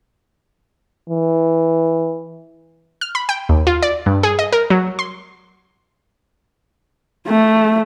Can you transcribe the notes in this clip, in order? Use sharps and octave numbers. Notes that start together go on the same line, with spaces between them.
E3
F6
B5
G5
D#2
F4
D5
G2
G#4
D#5
A#4
F#3
C6
A3